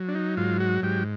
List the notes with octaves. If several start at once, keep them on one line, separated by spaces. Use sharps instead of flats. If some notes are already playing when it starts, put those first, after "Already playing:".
Already playing: F#3
D4
D#4
G#2 F4
F#4
G#2 G4